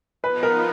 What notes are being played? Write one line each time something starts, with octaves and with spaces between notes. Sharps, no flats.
F3 B3 D#4 B4
A#4